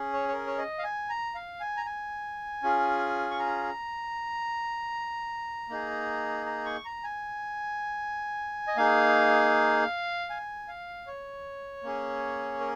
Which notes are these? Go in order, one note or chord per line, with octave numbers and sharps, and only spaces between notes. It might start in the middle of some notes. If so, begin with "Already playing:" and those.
Already playing: C#4 G#4
C#5
C#5
A#4
C#5
D#5
F5
G#5
A#5
F5
G#5
A#5
G#5
C#4 F4 G#4
C#6
A#5
A#3 D#4 G#4
A#5
C#6
A#5
G#5
D#5
A#3 D#4 G#4 F5
G#5
F5
C#5
A#3 C#4 G#4
A#4